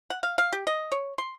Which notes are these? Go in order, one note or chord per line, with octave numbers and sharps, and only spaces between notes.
F#5
F5
F5
G4
D#5
C#5
C6